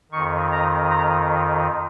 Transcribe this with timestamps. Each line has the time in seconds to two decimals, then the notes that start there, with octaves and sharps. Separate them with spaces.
0.12 F2 D#3 C#6
0.52 A#5
0.90 A#5